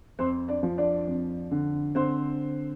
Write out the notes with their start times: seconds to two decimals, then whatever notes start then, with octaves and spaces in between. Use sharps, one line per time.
0.19 F2 C4 C5
0.48 D4 D5
0.63 F3
0.78 D4 D5
1.07 F2
1.51 D3
1.95 D3 C4 C5